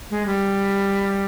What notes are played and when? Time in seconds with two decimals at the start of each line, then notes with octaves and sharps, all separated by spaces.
0.11 G#3
0.26 G3